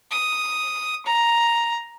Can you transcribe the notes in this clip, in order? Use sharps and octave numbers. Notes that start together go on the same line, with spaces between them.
D#6
A#5